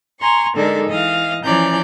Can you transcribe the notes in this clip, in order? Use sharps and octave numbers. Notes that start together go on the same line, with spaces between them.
G#5 A#5 C6 C#6
D3 G#3 D#4 A4 A#4 D5
E3 D#5 F5
E3 F3 C#4 D5 A#5 G6